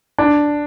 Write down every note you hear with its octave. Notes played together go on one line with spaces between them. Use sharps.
D4